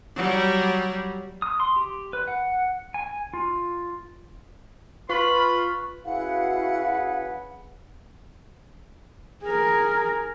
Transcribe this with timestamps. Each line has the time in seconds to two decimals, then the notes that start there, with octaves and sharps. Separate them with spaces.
0.16 F#3 G3
1.42 D#6
1.60 C6
1.76 G4
2.13 B4
2.27 F#5
2.94 G#5
3.34 F4
5.09 F4 B4 B5 C#6 F#6
6.05 C#4 E4 F#4 G#4 B4 F5 F#5
9.44 G#4 A#4